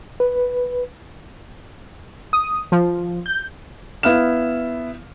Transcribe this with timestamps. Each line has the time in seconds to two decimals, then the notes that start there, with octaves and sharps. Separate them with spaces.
0.20 B4
2.33 D#6
2.72 F3
3.26 G6
4.03 B3 E4 F5 F6 E7